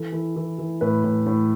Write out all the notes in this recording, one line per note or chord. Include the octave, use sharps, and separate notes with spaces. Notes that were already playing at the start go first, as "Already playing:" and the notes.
Already playing: E3 A4
E3
E3
E3
A2 B4
A2
A2